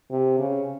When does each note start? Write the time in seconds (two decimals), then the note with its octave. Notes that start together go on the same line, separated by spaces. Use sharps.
0.11 C3
0.39 C#3